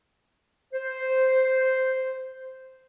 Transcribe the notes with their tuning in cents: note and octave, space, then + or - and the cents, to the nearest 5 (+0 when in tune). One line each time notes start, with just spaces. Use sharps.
C5 -5